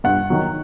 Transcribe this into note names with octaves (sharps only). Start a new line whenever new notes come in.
G2 F#5
D#3 F#3